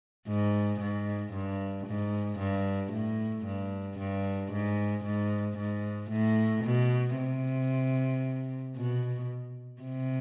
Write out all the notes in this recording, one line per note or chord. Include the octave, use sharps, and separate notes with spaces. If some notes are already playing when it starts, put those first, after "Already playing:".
G#2
G#2
G2
G#2
G2
A2
G2
G2
G#2
G#2
G#2
A2
B2
C3
B2
C3